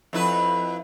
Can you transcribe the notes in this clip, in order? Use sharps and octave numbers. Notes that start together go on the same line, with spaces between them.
F2 E4 B4